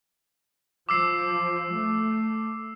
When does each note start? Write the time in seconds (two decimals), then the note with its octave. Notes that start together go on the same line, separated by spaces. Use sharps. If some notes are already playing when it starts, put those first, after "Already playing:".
0.89 F3 D6 E6 C7
1.73 A3